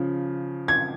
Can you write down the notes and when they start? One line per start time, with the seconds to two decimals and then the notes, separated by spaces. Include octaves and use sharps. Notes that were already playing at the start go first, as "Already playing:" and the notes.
Already playing: C#3 F3
0.68 G#6